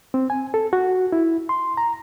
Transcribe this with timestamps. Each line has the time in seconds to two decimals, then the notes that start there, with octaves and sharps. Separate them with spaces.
0.14 C4
0.30 G#5
0.54 A4
0.73 F#4
1.12 E4
1.49 C6
1.77 A#5